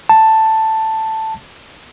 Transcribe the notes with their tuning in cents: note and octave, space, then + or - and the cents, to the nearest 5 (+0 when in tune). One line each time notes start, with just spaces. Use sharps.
A5 +5